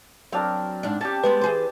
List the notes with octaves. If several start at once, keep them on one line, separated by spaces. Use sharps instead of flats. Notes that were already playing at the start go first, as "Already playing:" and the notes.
F#3 C4 D4 A#4 F5
G#2 D4
C#4 G4 A5
G#3 B3 C4 B4
E3 G#4 C5